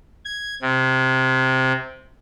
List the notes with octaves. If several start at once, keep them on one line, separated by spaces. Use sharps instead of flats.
G#6
C3